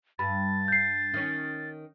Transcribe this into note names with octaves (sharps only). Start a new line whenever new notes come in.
G2 B5 A6
G6 C7
D#3 C#4